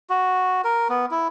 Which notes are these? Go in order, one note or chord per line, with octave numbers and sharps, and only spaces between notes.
F#4
A#4
B3
E4